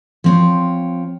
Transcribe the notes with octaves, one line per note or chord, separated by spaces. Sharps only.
F3 C4 C#5